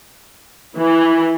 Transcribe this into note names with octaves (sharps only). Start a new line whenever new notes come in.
E3